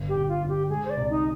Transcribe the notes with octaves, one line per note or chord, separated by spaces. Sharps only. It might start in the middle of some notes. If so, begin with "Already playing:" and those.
Already playing: G1
G4
G1
F4
G1
G4
G#3 G#4
C5
D5
C2
D#4